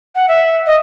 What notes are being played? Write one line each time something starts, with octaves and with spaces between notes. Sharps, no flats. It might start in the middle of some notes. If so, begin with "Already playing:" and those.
F#5
E5
D#5